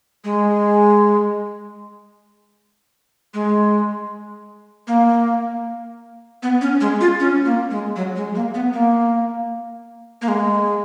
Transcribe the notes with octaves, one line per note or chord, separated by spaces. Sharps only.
G#3
G#3
A#3
B3
C#4
G#3
F4
C#4
A#3
G#3
F#3
G#3
A#3
B3
A#3
A#3
G#3